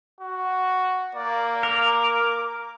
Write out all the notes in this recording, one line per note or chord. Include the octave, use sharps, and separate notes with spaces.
F#4
A#3 D5
A#4 D6